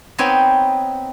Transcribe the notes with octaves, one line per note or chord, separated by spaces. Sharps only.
B3 C4 D#4 C#5 G5 G#5